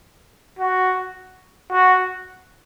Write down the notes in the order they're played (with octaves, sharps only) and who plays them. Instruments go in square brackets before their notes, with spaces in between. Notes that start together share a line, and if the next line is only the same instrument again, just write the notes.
[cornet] F#4
F#4